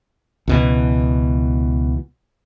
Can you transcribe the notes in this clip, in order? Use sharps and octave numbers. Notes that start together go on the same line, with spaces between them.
C#2 B2 E3